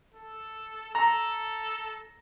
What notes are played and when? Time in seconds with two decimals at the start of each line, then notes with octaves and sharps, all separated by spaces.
0.14 A4
0.95 A4 A#5